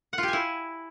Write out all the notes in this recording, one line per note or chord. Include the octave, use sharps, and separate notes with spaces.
F#5
F4
G4
G#5
E4